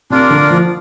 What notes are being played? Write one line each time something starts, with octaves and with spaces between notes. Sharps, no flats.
C3 D4 F4 A#4 D5
D3
F3